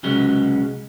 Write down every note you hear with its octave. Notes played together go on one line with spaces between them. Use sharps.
C2 C#3 F#3 G#3 B3 C#4